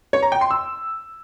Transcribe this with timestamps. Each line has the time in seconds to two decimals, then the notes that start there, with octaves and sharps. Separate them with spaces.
0.13 C#5
0.23 A#5
0.32 G5
0.41 C6
0.51 E6